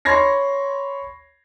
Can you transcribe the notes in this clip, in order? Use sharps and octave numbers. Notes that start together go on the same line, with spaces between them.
C#5 B5 C6 G#6 A#6 C7